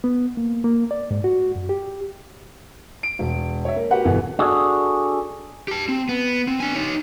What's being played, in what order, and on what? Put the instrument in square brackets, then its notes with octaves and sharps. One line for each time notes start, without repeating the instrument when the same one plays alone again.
[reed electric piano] B3
A#3
A#3
D5
G#2
F#4
F#2
G4
[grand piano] D7
E1
C#5 E5
A#3
A#3 F#4 G4 B4 F#5
G1 B2 E3
[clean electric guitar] D4 F#4 G#4 A4
[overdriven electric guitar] G4 A5
C4
B3
C4
D4 G#5
D#4 C#5